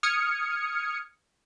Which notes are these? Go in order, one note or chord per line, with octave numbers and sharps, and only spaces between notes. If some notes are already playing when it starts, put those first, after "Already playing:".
D#6 F6 G#6 C#7